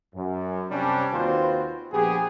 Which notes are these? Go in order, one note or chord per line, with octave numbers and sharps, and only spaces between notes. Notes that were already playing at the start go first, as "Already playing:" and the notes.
F#2
C3 G3 C#4 D4
D#2 C4 F4 F#4 B4 C5
A#1 B3 G4 G#4